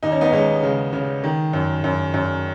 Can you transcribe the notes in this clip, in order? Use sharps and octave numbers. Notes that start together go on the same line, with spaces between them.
D#2 D#4
C#4
B3 D#4
D#2 G#3 C#4
C#3 G#3
C#3
D#3
F#2
F#2
F#2